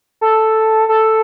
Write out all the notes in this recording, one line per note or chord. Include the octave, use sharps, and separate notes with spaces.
A4
A4